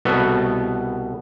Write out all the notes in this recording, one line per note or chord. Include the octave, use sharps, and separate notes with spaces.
C2 B2 B3 A4